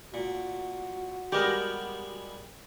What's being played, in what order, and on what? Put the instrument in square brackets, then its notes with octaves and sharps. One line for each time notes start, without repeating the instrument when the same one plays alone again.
[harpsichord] A#2 [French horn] F#4
[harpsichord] G3 G#3 B3 [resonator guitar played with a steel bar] G4 A#4 D#5